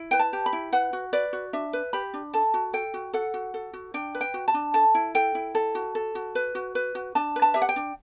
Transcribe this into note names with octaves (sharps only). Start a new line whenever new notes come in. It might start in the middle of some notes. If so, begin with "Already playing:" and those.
Already playing: E4
B4 G5
A5
G4
B5
E4
B4 F#5
F#4
B4 D5
F#4
D4 E5
B4
G4 B5
D4
A4 A5
F#4
A4 G5
F#4
A4 F#5
F#4
A4
F#4
D4 G5
B4
G5
F#4
A5
D4
A4 A5
E4
A4 G5
E4
A4
F#4
A4
F#4
B4
F#4
B4
F#4
D4 A5
B4
A5
G4 E5
F#5
G5
D4